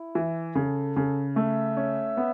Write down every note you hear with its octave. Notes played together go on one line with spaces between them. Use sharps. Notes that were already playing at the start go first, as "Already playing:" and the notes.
Already playing: E4
E3
C#3 A4
C#3
A3 E5
C#4
B3